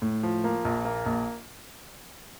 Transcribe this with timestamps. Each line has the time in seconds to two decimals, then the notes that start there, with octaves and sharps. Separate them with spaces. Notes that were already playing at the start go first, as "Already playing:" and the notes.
0.02 A2
0.23 F3
0.44 A#3
0.65 A#1
0.85 A#3
1.06 A#1